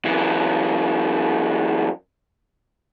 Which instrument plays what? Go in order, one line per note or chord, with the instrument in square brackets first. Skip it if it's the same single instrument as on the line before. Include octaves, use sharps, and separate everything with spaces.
[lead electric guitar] F#2 E3